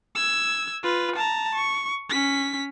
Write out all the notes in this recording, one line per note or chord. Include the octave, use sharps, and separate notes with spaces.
E6 G#6
F4 B4
A5 A#5
C#6
C#4 B6